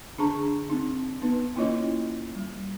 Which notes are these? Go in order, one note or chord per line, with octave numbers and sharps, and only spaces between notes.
D3 D4 G#4 A5 A#5 C#6
C4 D#4
B3 D#4 B4
A#3 C#4 E4 F4 C#5 D#5
G3